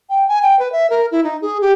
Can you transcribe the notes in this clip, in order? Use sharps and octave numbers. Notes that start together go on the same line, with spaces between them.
G5
G#5
G5
B4
E5
A#4
E4
D#4
G#4
G4